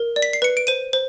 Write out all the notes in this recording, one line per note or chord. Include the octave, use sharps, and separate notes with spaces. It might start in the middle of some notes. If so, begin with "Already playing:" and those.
Already playing: A#4
D5
B6
C7
B4 C#7
D7
C5 D#7
C5